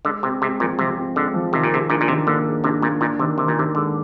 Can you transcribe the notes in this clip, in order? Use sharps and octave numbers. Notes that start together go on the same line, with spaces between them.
D3 G#3
C3 C4
C3 G#3
A#2 F3
C3 F3
C4
D3 G#3
F3
C3 D#3
A#2
C3 G#4
A#2 D4
A#2
C3 D#3
D3 A#3
G#4
C3 D4
A#2 A#3
A#2 D4
C3 D#3
C3 D#3
A#2
C3 D#3
D3 G#3